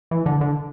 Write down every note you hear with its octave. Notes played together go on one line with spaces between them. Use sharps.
E3
D3
D3